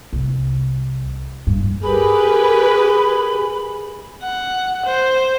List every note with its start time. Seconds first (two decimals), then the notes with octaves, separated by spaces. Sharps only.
0.13 C2
1.47 G2
1.83 G4 G#4 A#4 B4 B5
4.23 F#5
4.85 C5